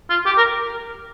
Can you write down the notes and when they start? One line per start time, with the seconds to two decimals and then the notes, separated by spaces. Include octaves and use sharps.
0.10 F4
0.26 G4
0.37 A#4